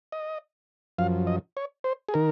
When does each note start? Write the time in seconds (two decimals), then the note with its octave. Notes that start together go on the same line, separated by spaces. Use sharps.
0.12 D#5
0.98 F#2 F3 F5
1.27 D#5
1.57 C#5
1.84 C5
2.09 G#4
2.14 D#3 A#4